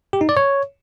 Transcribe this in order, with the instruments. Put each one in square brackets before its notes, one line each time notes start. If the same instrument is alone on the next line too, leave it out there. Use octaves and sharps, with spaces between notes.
[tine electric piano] G4
D#4
D5
C#5